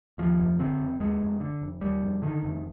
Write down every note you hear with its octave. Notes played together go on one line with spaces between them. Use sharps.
D#2 F3
F1
D3 C4
F1
D#2 G#3
F1
D3
F1
D#2 G3
F1
D3 D#3
F1